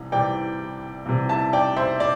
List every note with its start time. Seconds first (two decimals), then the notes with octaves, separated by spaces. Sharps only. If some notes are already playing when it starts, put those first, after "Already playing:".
Already playing: C2 C3 E3
0.12 C2 C3 E3 D5 G5
1.06 C2 C3 E3
1.29 E5 A5
1.53 D5 G5
1.77 C5 E5
2.00 D5